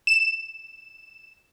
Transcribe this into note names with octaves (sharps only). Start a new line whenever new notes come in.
E7